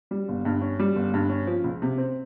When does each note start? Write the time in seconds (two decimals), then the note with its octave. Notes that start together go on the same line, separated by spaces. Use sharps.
0.11 G3
0.28 G1
0.45 G2
0.61 C#4
0.79 G3
0.96 G1
1.14 G2
1.29 C#4
1.47 F3
1.64 C#2
1.82 C3
1.98 C4